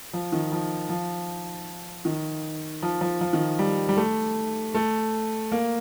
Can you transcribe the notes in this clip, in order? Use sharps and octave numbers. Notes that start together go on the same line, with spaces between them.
F3
D#3
F3
F3
D#3
F3
F3
F3
D#3
G3
G3
A3
A3
A#3